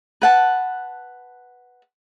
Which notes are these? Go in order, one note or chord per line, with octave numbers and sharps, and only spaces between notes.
B4 F#5 A5